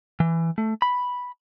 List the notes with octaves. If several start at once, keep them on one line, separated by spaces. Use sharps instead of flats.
E3
A3
B5